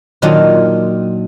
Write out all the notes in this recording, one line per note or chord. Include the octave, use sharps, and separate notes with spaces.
A#2 D#3 F#3 D4 D#4 F4